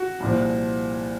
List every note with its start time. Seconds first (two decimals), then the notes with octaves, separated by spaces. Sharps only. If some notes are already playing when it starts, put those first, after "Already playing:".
Already playing: F#4
0.20 C2 A#2 F3